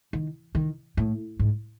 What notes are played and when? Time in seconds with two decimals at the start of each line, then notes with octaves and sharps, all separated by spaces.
0.13 D#3
0.55 D#3
0.97 A2
1.39 G#2